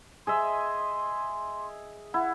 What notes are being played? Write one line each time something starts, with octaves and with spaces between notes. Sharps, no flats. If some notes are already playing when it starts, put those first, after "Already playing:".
G#4 D#5 E5 C6
E4 F#5